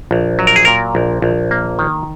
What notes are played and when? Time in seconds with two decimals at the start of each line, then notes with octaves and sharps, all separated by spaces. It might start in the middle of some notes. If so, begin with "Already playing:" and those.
0.11 A#1
0.39 F#3
0.47 A#4
0.56 G#4
0.65 A#2 A#4
0.95 A#1
1.22 A#1
1.51 A#3
1.79 D#3